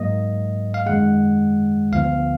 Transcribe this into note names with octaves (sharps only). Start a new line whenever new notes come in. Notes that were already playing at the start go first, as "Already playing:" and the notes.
Already playing: G#2 F#3 A#3 D#5
F5
F#2 D#3 G#3 F#5
D2 D3 F3 B3 F5